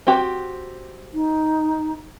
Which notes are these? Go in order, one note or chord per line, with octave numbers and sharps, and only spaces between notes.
C4 F#4 G4
D#4